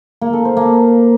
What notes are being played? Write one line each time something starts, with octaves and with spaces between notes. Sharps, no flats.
A#3
A4
C5
A#3